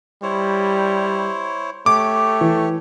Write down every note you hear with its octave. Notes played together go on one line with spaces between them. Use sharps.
G3 E4 C5 C#5
A3 G4 C#5 D6
E3